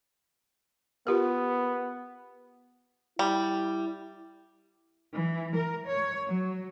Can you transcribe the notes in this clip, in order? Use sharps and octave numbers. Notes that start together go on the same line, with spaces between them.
B3 F4 G4 A#4
G3 E4
E3
A#4
C#5
F#3